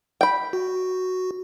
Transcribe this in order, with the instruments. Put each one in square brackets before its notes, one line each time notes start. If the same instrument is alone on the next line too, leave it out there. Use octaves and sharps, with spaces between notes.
[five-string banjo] G5 B5
[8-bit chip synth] F#4